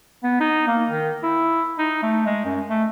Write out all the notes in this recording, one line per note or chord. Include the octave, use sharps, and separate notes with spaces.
B3
D#4
A#3
D#3
E4
D#4
A3
G#3
F#2
A3